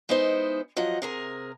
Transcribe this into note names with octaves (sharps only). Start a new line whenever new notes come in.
G#3 B3 D#4 E4 C5
F3 F#3 D#5 F#5
C3 G#4 A#4